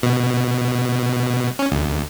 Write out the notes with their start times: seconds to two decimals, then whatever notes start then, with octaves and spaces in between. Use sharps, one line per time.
0.03 B2
1.59 C#4
1.71 D2